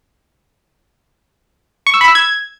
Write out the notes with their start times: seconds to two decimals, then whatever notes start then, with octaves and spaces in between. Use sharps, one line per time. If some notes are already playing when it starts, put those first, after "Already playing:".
1.87 C#6
1.94 E6
2.01 B5
2.08 E6
2.15 G#6